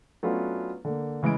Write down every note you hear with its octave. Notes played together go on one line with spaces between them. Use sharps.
F#3 A3 B3 C#4 D4 F4
D3 A#3
C#3 E3 G#3 D#5 D7